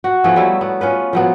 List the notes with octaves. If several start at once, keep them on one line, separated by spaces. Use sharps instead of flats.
F#4
E3 F3 A3 B3
F#3 G3 A3 E4
B3
C#4 F4 B4
F3 F#3 B3